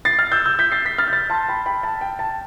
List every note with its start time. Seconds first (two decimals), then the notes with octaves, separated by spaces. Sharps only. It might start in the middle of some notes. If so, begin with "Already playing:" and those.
0.05 A6 C7
0.19 F6 A6
0.32 E6 G6
0.45 E6 G6
0.59 G6 B6
0.72 A6 C7
0.85 G6 B6
0.98 F6 A6
1.08 G6
1.13 F6 A6
1.30 A5 C6
1.49 G5 B5
1.66 G5 B5
1.83 A5
2.01 G5
2.19 A5